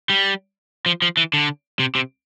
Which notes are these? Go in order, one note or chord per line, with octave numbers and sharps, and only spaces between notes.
G3
F3
F3
E3
D3
C3
C3